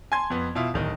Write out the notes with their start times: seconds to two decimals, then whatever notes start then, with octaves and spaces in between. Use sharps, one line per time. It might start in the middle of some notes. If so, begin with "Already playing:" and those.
0.12 G#5 A5 C6 G#6
0.30 F2 B3
0.55 B2 E4 F4
0.74 D1 D#3 D#4